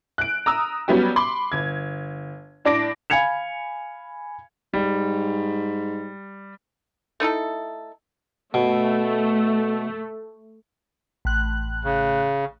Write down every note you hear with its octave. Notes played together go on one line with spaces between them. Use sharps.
F#6 D7
A#5 D#6 E6
F#3 G3 B3 C#4 G4
B5 C6 D6
G1 G#6
A2 D4 D6 A#6 D7
F5 G#5 B5 G#6 C#7 F7
G#2 G3
A3 D#4 E4 A4
B2 A3
A1 F#6
C#3